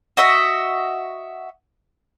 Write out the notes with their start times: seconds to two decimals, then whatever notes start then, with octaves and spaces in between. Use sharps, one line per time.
0.17 F#4 D#5 E5